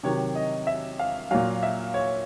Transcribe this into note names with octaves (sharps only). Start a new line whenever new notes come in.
C3 D#3 F#3 C#5
D#5
E5
F5
A#2 F#3 F5
E5
C#5